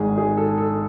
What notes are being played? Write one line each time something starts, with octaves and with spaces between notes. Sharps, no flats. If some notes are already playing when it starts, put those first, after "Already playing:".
Already playing: G#1 G#2 D#3 G#4
G#4
A4
A4